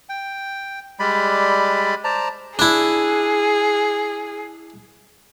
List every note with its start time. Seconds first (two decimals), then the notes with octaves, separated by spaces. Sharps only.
0.09 G5
0.99 G3 G#3 D5 B5
2.04 C5 D5 A5 A#5
2.59 D4 E4 G#4